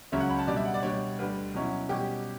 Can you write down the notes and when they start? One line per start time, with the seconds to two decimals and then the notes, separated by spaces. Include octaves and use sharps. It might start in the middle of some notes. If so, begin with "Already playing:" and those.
0.12 C#2 C#3 F#3 C#4 E5
0.21 F#5
0.30 B5
0.39 A5
0.47 B2 G3 D4 D5
0.57 E5
0.65 F#5
0.74 D5
0.83 B2 G3 D4 C#5
1.19 D2 D3 G3 B4
1.54 B2 F#3 C#4 E4
1.89 B2 G3 C#4 G4